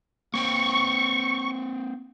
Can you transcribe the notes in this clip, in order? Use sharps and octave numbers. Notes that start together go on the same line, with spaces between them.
A#3 C4 G5 C#6